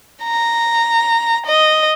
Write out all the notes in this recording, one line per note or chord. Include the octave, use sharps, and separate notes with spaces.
A#5
D#5